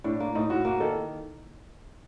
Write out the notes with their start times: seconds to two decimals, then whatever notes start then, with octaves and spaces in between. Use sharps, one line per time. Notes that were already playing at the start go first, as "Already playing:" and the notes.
0.04 A2 D4
0.20 A#3
0.35 A2 D#4
0.50 A2 F#4
0.65 A#3 F#4
0.80 D#3 A4